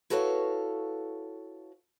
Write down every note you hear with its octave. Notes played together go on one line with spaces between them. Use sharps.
E4 F#4 A4 B4 C#5 F5